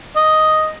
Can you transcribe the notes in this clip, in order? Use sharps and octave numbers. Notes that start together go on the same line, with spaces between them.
D#5